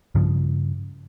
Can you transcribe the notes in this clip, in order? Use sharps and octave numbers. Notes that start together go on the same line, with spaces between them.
G2 C#3 F3